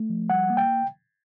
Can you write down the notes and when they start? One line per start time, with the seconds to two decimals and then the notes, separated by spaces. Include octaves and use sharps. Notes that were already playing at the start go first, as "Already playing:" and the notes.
Already playing: A3
0.10 F3
0.30 G3 F#5
0.50 A#3
0.57 G5